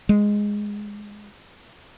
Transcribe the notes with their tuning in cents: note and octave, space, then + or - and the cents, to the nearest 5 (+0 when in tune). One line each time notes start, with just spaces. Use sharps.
G#3 -5